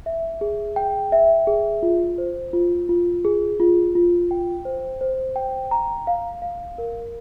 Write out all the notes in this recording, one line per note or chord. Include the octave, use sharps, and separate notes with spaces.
E5
G#4
G5
E5
G#4
F4
C5
F4
F4
G#4
F4
F4
G5
C5
C5
G5
A#5
F5
F5
A#4